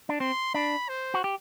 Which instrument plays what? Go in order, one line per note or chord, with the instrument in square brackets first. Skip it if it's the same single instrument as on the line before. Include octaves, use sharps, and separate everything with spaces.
[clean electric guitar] D4
[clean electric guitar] C4 [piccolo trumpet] C6
[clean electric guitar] D4 [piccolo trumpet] B5
[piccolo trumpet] C5
[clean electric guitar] F#4
G4